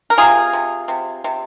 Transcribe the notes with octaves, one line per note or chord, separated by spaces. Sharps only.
A#4
C3 F4 G#4
C3
C3
C3